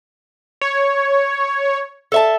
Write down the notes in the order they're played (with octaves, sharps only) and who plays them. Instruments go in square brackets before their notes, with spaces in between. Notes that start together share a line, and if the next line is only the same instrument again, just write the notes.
[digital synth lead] C#5
[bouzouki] A4 E5 A5